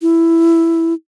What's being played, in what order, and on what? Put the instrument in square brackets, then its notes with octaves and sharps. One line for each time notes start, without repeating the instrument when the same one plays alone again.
[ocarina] E4